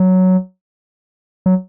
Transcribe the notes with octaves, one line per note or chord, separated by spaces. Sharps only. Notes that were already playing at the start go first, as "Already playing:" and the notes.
Already playing: F#3
F#3